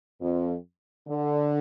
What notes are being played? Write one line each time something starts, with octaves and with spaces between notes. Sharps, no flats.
F2
D3